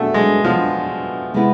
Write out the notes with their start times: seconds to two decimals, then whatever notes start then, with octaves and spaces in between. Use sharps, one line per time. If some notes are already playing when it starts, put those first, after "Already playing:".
Already playing: B2 A3 B3 D4 G#4
0.14 G#3
0.44 B2 F3 B3 D4 F4 G#4
1.34 C3 G#3 B3 E4 B4